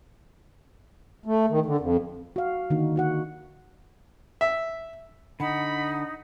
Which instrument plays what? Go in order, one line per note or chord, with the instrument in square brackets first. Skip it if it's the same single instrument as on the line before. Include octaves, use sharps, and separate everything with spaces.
[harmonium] A3
D#3
D3
F2
[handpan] F#4 F5
D3 D#3 A#3 D4 D#4 F#4
D#4 F#4 F#5
[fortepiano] E5
[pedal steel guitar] D3 [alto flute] D#4 [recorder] F#5 [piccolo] B5